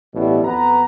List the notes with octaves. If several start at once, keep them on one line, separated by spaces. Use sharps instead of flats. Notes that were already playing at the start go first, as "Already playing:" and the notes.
A1 B2 B3 E4 G4 D5
F2 B3 B4 A#5